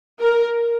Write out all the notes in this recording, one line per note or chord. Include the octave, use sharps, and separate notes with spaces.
A#4